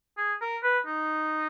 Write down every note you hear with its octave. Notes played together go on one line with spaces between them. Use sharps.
G#4
A#4
B4
D#4